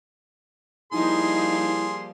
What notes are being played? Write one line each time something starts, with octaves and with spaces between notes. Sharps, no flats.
F3 G3 A#3 D#4 E4 G#4 C6